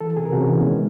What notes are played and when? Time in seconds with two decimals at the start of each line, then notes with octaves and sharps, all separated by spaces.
0.01 E3 A4
0.17 C3 G#4
0.25 A#4
0.32 C3 F#4
0.40 C#4
0.49 E3
0.57 B3
0.65 D#3 G#3